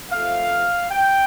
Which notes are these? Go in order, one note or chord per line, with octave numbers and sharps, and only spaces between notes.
C3 F3 A3 F5
G5